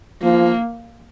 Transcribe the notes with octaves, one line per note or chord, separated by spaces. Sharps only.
F3 A#3